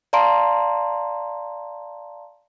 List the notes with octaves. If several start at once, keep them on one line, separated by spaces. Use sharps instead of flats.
D5 F5 A5 A#5 C6 D7